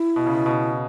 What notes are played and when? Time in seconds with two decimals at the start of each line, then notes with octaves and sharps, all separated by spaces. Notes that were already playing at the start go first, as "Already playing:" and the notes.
Already playing: E4
0.16 B2
0.26 C#3
0.35 B2
0.46 B2